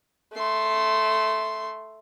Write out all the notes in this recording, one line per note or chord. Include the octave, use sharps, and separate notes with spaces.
A3 C6